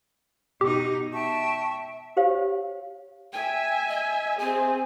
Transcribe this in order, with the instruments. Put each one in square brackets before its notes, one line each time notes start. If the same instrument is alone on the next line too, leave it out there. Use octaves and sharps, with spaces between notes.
[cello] B2 D#4 [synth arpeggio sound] G4
[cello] E5 [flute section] G5 A5 C#6
[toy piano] G4 C5 C#5 F5
[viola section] E5 G#5 [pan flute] G5
[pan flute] D#5
[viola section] C4 G#4 [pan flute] G#5